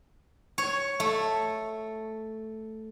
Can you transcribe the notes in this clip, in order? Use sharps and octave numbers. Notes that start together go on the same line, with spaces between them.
C#5
A3